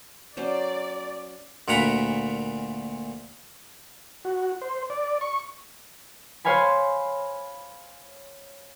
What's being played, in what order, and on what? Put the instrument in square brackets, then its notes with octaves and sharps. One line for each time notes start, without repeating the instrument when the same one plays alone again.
[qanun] F#3 C#4 C5 [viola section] D5
[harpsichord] D2 A#2 F#5 A#5 B5
[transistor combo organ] F#4
C5
D5
C#6
[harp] C5 C#5 F5 G#5 B5